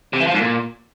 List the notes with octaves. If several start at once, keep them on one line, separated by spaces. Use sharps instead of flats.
C3
E3
F3
G#2
A#2